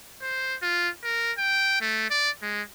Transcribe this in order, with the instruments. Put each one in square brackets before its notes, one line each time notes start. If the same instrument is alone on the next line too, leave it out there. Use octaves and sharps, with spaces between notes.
[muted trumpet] C5
F4
A#4
G5
A3
D5
G#3